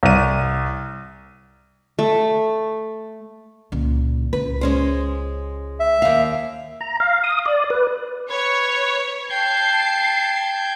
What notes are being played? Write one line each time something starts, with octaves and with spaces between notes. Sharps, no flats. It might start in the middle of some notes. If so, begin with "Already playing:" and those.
C2 D#7
A3
C#2 A#2
C#2 B4
G#3 C#4 C5
E5
D#2 F5
A#5
F5
D#6
D5
B4
B4 C#5 G#6
G5 A5 G6 G#6 C7